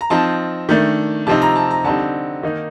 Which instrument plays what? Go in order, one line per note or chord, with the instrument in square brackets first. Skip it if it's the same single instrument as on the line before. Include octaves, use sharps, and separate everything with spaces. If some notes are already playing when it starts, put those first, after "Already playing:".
[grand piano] A#5
F3 C4 D#4 A5
D#3 A3 D4
C3 F3 C4 D#4 A5
A#5
A5
A#5
D3 G3 C4 D#4 A5
D#3 A#3 D#4